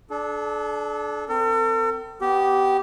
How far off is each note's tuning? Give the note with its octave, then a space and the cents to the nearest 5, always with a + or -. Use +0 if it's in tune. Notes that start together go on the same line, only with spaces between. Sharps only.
D4 +0 A4 -40
C4 -35 A4 +45
B3 +0 G4 -15